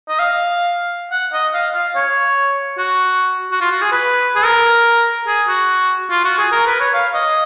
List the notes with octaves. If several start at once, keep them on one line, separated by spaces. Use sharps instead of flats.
D#5
F5
F#5
D#5
F5
F5
C#5
F#4
F#4
F4
F#4
G#4
B4
G#4
A#4
G#4
F#4
F4
F#4
G#4
A#4
B4
C#5
F5
D#5